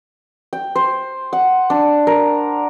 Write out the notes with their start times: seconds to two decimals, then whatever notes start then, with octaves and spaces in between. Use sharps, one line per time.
0.53 G5
0.76 C5
1.33 F#5
1.70 D4
2.07 A#4